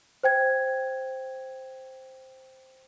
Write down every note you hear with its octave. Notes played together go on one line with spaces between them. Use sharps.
C5 G5 G#6